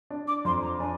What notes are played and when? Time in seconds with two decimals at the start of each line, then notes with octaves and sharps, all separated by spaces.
0.10 D4
0.28 D6
0.45 F2 C6
0.62 A#5
0.80 D4 G#5